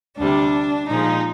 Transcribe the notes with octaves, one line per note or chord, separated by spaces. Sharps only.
D2 C3 G3 D4
A#2 F3 G#3 D#4